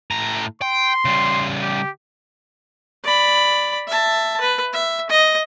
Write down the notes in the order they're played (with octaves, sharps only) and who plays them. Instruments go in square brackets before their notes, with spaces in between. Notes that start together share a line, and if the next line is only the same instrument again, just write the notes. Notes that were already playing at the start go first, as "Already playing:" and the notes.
[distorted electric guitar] A2 A#5
[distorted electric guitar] G5 [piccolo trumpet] C6
[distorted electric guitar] C#3 G3
[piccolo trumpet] G4
[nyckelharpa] D5 B5
E5 A5
B4
E5
D#5